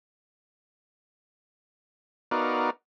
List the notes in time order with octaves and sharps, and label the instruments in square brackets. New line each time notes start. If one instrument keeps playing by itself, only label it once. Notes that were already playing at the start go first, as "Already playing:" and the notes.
[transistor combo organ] B3 D#4 F#4 A#4 D5 F5